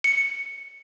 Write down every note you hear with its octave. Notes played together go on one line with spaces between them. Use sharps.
C#7